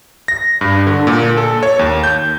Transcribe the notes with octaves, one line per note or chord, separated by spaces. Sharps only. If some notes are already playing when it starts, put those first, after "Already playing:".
A#6
G2
D3
A#2
A4
C#5
D#2
G6